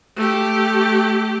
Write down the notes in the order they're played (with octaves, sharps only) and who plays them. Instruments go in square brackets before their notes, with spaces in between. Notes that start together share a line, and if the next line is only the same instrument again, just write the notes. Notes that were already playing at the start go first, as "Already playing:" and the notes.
[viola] A3 G4